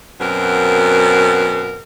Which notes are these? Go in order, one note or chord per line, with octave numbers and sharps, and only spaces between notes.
F#2 B2 C4 A#4